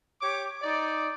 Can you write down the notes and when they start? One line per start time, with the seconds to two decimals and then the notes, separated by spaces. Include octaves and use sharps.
0.22 G4 C#5 D6
0.63 D#4 D5